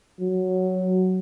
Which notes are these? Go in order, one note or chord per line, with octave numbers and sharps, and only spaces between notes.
F#3